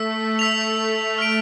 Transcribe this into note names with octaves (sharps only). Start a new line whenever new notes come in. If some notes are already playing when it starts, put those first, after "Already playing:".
Already playing: A3 E6 B6
E6 B6 F7
F6 B6 D7